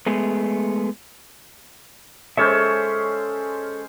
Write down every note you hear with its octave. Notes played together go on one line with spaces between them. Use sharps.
G#3 A3 B3 G#4
G#3 C#4 A4 C5 C#5 E5